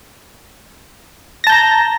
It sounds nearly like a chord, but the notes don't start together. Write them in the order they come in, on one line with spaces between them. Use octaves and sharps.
A#6 A5 G6 A#5